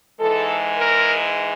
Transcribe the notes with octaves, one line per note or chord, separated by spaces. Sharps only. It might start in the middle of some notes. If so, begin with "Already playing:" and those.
G#2 E3 G#3 A4
A#4